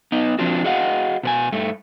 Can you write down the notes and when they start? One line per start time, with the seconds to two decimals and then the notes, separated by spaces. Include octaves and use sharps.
0.12 B3 D#4 D#5
0.39 F3 C4 D4 F4 F#4
0.64 F#4 G#4 D#5 F5 F#5
1.23 B2 B4 G#5
1.52 G2 A3